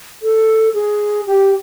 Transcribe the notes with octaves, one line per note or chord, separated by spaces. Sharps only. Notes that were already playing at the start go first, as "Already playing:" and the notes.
A4
G#4
G4